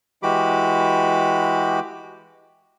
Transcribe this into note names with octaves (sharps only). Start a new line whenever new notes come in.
E3 G#3 F#4 G4 B5 D6